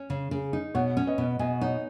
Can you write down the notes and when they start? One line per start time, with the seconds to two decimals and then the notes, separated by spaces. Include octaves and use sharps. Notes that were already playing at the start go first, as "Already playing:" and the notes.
Already playing: C#4
0.10 C#3
0.31 C#3
0.53 D#4
0.75 B2 C#5 F#5
0.97 C#4
1.07 B4 D#5
1.18 B2
1.39 B2 D#5 G#5
1.61 D#4 C#5 F#5